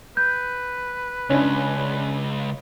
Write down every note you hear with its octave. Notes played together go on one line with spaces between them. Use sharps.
B4 G6
C#2 C#4 D4